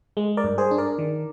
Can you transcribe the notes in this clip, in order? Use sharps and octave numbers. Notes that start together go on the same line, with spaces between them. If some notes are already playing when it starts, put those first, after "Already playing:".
G#3
A#4 D5
G2
G#4 C5
D4
A#4 D5
D#3